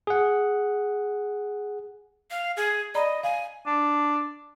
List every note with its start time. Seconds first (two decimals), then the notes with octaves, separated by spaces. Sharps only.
0.07 G#4 F#5
2.31 F5
2.57 G#4
2.95 D5 D#5 A#5 B5
3.23 F5 G#5
3.66 D4